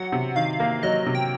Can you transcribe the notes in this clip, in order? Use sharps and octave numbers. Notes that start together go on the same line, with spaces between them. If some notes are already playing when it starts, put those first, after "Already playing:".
Already playing: F#3 F#5
C3
D#3 F5
A#3
F#3 D#5
C3
G5